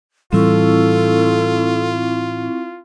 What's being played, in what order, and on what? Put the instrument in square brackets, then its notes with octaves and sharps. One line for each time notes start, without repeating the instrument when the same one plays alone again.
[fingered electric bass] A2 E3 G3 [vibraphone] C4 E4 C#6 [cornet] F4 [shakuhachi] A4